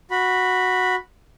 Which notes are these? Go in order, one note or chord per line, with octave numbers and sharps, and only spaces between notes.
F#4 B5